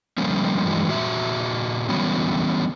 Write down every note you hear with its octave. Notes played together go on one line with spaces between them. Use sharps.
D3 F3 G3 A#3 C#4
G2 E3 F#3 G#3
A#2 F#4 E5
D3 E3 F#3 G3 B3 C#4